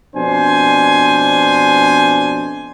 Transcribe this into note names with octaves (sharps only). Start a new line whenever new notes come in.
F2 B2 D4 C5 G#5